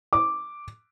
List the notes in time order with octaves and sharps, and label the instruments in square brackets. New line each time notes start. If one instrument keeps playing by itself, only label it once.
[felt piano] D6